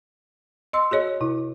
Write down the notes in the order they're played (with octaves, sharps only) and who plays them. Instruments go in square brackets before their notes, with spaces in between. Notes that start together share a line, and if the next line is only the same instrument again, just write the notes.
[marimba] D#5 C6 E6
F#4 G#4 C#5 D#5
C3 E4